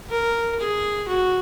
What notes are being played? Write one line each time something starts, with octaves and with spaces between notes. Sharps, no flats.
A#4
G#4
F#4